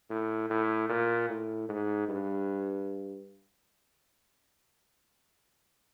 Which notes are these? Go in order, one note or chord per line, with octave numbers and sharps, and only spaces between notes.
A2
A2
A#2
A2
G#2
G2